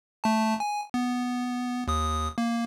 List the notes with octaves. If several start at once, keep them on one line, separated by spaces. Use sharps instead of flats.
A3 A5
G#5
B3
D#2 D#6
A#3